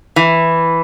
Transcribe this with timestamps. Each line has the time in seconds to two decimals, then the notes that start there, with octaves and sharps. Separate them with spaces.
0.16 E3